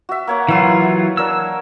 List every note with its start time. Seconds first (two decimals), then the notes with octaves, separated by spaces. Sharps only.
0.09 F#4 E5
0.27 A#3 C#5 F#5
0.48 E3 F#3 E4 F4 F#5
1.17 D4 A#4 C#5 E6